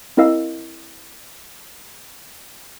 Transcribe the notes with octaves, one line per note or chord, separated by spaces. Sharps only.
C4 E4 A#4 D#5 F5 E6